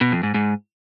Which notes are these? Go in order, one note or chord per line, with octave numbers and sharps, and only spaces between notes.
B2
F2
G#2
G#2